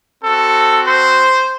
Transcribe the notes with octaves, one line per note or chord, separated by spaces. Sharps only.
C4 F#4 A4
C5